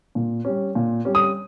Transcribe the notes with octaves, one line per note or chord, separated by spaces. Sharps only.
A#2
G3 C#4
A#2
G3 C#4
D#6